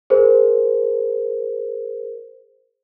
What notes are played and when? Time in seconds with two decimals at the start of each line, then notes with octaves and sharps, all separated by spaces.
0.10 G#4 A#4 C5